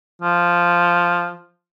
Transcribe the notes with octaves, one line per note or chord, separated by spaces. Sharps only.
F3